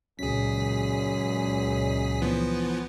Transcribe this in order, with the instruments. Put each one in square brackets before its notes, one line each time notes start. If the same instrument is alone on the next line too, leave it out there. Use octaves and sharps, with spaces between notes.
[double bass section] C#2 A#2 [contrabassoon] F#2 [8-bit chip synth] G#4 B6
[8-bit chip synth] E3 F3 B3